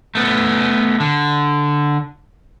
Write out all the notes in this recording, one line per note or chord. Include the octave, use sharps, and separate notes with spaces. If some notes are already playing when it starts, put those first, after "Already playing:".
A3 B3
D3